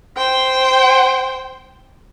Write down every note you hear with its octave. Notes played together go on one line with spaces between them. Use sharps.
C5 G5